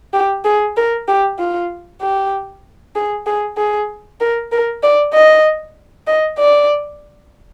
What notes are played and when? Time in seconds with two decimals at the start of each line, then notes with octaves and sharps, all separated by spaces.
0.13 G4
0.45 G#4
0.77 A#4
1.08 G4
1.39 F4
2.01 G4
2.95 G#4
3.26 G#4
3.57 G#4
4.20 A#4
4.52 A#4
4.83 D5
5.14 D#5
6.07 D#5
6.39 D5